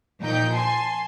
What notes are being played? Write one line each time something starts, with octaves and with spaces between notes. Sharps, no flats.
A#2 F3 D#4 G5 G6
G#5 A5 C6